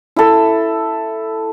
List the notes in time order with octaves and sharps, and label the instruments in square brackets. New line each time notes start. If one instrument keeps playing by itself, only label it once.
[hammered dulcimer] E4 A4